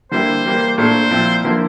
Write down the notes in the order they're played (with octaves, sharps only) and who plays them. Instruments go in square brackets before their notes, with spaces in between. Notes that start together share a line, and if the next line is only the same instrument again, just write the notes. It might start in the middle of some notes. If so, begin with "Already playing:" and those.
[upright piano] D3 G3 A#3 E4 [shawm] C5
[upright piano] E3 G3 A#3
[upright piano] A#2 A3 D4 [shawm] C5
[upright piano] A#2 F3 C4 E4
D3 F3 A#3 E4